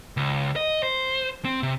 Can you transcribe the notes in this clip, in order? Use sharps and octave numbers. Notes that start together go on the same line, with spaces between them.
C#2
D#5
C5
C4
C3